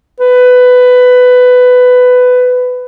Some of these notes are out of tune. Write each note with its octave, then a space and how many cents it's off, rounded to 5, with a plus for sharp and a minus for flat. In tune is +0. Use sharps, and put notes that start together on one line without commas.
B4 +15